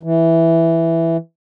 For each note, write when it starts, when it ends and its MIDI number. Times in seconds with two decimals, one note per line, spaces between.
0.03 1.17 52